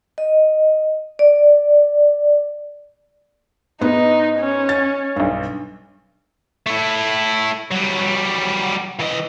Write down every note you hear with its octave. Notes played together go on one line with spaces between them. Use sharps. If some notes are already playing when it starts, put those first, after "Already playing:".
D#5
D5
G#2 B3 D#4
C#4
A6
B1 G2
A3 E4
F#3 G3
E3 D#5